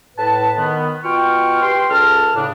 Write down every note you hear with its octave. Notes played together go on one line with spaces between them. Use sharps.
A2 B4 A5
D#3 B3
B2 F4 G5 C#6 F6
G4 B4 G5 C6
C#2 A4 A5 F6
A2 C#3 D4